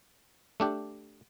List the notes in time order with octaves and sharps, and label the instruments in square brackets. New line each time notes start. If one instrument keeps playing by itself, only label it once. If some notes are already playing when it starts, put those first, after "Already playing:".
[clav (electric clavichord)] A3 D4 G4